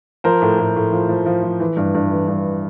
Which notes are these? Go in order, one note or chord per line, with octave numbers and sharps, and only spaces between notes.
F3 A#4 C5
A2
A2
A2
F3
F3
F3
F3
E3
G2
G2
E3
G2